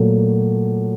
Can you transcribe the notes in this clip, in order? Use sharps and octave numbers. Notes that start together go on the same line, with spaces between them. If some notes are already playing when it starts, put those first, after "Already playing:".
Already playing: A#2 F#3 A3